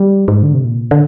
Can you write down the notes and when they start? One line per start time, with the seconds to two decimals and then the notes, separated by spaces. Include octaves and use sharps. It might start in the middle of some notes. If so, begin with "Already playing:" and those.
Already playing: G3
0.28 G#2
0.43 D3
0.53 C3
0.65 A#2
0.91 D3